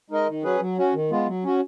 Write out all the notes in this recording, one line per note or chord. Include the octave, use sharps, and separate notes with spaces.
G#3 D#4 A#4 D#5
D#3
F#3 C#4 G#4 B4
F#3
C#4 F#4
D#3
G#3 B3 F4
F#3
C#4 F#4